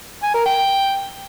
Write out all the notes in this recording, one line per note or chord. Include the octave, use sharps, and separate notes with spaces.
G#5
A#4
G5